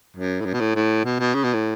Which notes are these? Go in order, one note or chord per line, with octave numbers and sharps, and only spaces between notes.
F#2
A2
F#2
B2
A2
A2
B2
B2
C#3
B2
A2